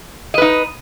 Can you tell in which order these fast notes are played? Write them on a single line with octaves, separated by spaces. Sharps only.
D#5 B4 D#4